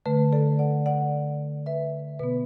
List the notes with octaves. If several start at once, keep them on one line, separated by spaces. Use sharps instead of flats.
D3 A3 B4
A4 D5
D5 F#5
D5 F#5
B4 E5
B2 B3 B4